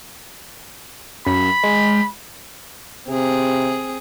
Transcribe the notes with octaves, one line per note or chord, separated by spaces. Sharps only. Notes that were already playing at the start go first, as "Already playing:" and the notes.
F#2 B5
G#3
C3 C4 G#4